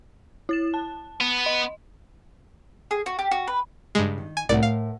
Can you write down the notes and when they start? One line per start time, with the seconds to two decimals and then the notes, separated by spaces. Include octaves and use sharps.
0.49 E4 A6 E7
0.74 A5
1.20 B3
1.46 D#5
2.91 G#4
3.06 F#4
3.19 G4
3.31 F#4
3.47 B4
3.95 G2 C#3 G#3
4.18 D#3
4.37 G#5
4.49 C2 A2 A#4 D5 F#5
4.63 F5